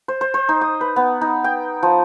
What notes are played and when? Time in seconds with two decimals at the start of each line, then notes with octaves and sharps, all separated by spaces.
0.08 C5
0.21 C5
0.34 C5
0.49 D#4
0.61 D#6
0.81 B4
0.96 B3
1.21 D#4
1.44 G5
1.83 F3